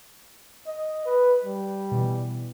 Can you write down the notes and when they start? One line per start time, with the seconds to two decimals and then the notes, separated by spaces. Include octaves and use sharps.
0.67 D#5
1.06 B4
1.45 G3
1.92 B2 E3